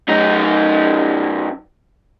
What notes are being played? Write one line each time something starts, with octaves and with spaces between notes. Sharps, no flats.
F#2 D#4